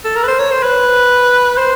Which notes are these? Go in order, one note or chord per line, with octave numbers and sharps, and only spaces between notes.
A4
A#4
B4
C5
C#5
C5
B4
C5